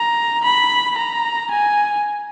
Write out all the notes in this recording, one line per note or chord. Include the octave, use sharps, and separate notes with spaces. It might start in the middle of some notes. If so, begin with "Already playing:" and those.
Already playing: A#5
B5
A#5
G#5